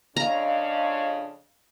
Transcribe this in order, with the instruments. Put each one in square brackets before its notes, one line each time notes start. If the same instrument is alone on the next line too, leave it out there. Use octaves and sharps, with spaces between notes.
[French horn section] F2 C#3 C#5 [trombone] D4 [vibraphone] D#5 F5 [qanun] A#5